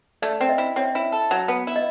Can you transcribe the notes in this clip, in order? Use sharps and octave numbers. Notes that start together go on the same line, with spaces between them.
A3 D5
C4 D5
D#5
E4
C4 C#5
E4
A4
F#3
B3
E4
D#5